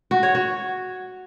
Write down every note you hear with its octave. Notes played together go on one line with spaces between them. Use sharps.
F#4
C#5
F#4